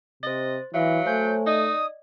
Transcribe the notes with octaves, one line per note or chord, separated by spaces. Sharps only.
C3 C5 D#5 A6
E3 F#3 E5 F5
A3 C5 C#5 G#5 G6
D#4 D5 D#5 D#6